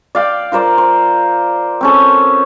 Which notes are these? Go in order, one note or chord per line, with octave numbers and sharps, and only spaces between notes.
D5 F5 G5
F4 A#4 C5 D5
C5
C4 C#4 A4